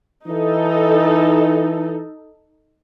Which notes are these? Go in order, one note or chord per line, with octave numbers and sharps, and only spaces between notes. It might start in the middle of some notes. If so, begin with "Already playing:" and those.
E3 D#4 A4